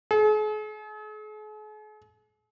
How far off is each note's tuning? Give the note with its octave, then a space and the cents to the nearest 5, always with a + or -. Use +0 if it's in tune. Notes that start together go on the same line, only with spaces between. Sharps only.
G#4 +45